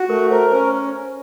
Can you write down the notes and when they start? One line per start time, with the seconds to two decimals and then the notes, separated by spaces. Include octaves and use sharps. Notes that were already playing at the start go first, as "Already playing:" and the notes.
Already playing: F#4
0.09 A3 A#4
0.31 A#4 C5
0.52 C#4 C5